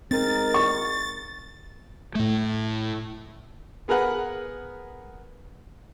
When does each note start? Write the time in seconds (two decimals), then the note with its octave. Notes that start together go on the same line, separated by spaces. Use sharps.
0.11 G#3 C4 D#4 A#4 A6
0.54 C#6
2.15 A2 A3
3.88 B3 G#4 A#4 B4 F#5